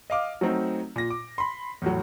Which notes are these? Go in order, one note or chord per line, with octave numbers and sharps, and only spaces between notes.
D#5 F5 D6 F6
F#3 A3 C4 D#4
A#2 A#6
D6
B5 C6
E2 A2 F#3